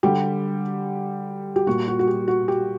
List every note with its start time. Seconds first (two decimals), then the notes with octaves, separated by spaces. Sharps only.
0.03 D3 G3 G4
1.56 G4
1.67 A#2 G3 F#4
1.88 F#4
1.99 F#4
2.07 G4
2.28 F#4
2.48 G4